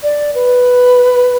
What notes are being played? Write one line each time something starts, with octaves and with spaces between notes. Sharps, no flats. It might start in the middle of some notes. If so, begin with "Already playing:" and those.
D5
B4